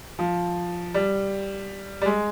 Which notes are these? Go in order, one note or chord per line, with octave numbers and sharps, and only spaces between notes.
F3
G3
G3
G#3